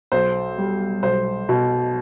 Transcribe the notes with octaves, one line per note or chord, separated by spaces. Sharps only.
B1 C5
G3
B1 C5
B2